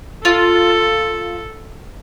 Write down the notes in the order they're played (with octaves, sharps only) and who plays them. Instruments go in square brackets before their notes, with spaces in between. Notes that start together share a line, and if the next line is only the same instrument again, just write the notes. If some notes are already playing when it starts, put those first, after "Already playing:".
[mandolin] F4 [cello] A4